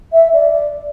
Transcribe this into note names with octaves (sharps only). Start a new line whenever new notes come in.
E5
D5